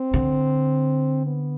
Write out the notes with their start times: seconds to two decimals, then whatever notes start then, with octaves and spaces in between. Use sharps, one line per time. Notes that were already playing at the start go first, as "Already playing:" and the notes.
Already playing: C4
0.14 D3
1.27 B3